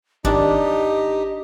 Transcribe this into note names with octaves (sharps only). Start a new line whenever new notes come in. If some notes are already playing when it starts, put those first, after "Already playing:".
G#1 D#3 D4 D#4 G4